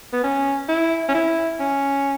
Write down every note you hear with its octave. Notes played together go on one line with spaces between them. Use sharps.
B3
C#4
E4
C#4
E4
C#4